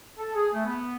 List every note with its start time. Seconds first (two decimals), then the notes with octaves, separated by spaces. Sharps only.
0.19 A4
0.34 G#4
0.54 A3
0.65 B3